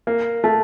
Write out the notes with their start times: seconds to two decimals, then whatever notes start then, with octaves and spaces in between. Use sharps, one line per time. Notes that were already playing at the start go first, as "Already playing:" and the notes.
0.07 A#3
0.44 A3